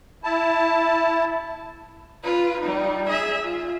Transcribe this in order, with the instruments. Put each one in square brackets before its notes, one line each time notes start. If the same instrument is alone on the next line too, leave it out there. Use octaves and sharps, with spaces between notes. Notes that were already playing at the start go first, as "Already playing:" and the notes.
[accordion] E4 A5
[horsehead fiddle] F4 B4
G3 D#4
G#4 E5
F4